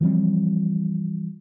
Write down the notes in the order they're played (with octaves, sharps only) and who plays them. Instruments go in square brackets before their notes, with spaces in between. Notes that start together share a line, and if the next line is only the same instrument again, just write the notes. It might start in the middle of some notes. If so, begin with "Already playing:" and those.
[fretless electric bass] E3 F3 G3 C4